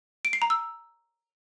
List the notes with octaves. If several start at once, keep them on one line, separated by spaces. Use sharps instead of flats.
D7
C7
A#5
E6